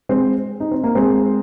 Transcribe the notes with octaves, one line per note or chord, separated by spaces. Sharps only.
G#3 C4
D#4
C4
A#3
G#3 C4